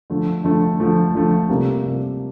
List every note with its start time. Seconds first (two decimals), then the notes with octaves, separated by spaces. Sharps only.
0.10 D3 F3 A3
0.44 D3 F3 A3
0.80 D3 F3 A3
1.14 D3 F3 A3
1.49 C3 G3 A#3 F4
1.84 C3 G3 A#3 F4